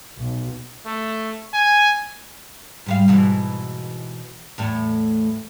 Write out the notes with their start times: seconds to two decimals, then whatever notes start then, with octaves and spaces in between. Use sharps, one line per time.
0.19 B1
0.86 A3
1.54 G#5
2.86 G#2 G3 F5
3.08 G#2 B2 E3
4.58 E2 A2